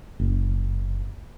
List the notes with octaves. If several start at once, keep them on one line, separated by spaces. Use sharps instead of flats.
F#1